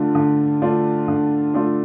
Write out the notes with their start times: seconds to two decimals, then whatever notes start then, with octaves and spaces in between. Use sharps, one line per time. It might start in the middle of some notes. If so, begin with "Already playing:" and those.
Already playing: D3 A3 D4 F4
0.15 D3
0.62 A3 D4 F4
1.08 D3
1.54 A3 D4 F4